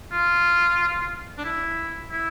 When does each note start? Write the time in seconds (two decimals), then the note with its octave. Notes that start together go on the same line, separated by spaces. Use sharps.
0.12 F4
1.38 D4
1.45 E4
2.12 E4